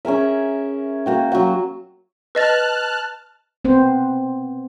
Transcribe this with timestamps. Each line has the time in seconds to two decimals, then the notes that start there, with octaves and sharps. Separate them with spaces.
0.05 C#4 G#4 A#4 E5
1.06 A#3 F#4 G5
1.32 F#3 F#4 F#5
2.35 B4 D#5 A5 F6 F#6 A6
3.65 B3 C4 C5